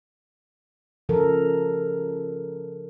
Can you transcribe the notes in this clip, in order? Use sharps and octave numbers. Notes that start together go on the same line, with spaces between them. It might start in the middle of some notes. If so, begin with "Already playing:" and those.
C#3 F3 A4 A#4